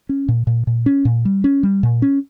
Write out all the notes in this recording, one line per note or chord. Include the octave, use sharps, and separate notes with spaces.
C#4
A#2
A#2
A#2
C#4
A#2
G3
C#4
G3
A#2
C#4